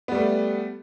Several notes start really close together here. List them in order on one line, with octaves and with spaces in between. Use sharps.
B3 G3 A3